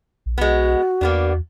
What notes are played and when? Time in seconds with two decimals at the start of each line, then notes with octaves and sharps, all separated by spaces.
0.26 A#1
0.38 B1 G#3 B3 F#4
1.01 E2 A#3 B3 D4